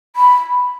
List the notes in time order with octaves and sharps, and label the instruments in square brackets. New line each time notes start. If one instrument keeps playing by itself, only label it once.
[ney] B5